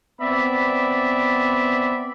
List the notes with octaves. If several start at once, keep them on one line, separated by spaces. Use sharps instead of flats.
B3 C4 D5 E5 B5